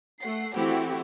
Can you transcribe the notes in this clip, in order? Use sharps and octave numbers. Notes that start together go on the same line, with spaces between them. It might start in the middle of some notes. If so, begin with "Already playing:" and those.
A3 F#5 C7
E3 A3 C4 E4 F#4 G4